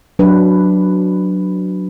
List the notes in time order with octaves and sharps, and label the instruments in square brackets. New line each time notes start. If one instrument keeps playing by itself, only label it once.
[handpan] F#3 D4 B4